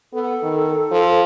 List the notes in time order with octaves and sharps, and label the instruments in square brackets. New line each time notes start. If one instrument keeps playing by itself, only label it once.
[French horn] B3 [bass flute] A4
[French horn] D#3
F3